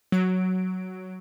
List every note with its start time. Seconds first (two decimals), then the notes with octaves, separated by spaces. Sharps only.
0.12 F#3 D7